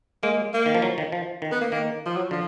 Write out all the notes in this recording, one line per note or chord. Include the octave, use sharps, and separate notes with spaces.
G#3 A#3
A#3
D#3
F3
F#3
D#3
F3
D#3
B3
A#3
D#3 A#3
F3
F#3
D3 F3